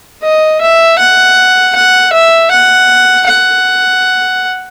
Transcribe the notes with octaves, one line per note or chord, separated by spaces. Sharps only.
D#5
E5
F#5
F#5
E5
F#5
F#5